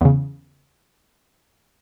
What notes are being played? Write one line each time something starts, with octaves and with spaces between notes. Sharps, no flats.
E2 C#3